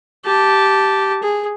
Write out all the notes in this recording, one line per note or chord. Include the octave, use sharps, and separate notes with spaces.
G4 A5
G#4